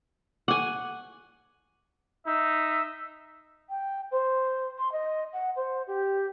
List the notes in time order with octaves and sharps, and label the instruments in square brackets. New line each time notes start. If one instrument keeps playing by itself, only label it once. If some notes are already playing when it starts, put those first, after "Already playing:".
[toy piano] A4 C#6 D6 [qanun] F#5 G#5
[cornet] D#4 [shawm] E5
[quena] G5
C5
C6
D#5
F#5
C5
G4